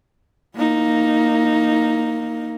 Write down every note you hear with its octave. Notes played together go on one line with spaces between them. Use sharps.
A#3 D#4